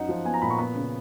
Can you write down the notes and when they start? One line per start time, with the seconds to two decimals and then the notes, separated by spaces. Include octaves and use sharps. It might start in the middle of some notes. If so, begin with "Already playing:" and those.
Already playing: F#2 D#4 F#5
0.09 F3
0.25 B3 G#5
0.34 A#5
0.42 A#2 B5
0.50 C#6
0.59 B3 B5
0.75 C#3